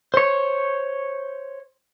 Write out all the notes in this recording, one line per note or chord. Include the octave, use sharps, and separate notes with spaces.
C5 C#5